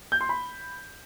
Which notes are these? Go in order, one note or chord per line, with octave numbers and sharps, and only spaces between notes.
G6
C6
B5